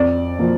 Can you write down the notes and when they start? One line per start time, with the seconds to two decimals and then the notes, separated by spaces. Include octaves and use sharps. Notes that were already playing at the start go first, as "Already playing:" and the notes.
Already playing: F2 D5
0.39 F3 A#3